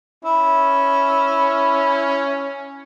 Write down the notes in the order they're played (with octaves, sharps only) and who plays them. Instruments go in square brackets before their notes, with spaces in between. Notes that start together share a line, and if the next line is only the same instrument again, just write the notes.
[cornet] C#4 [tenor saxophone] E4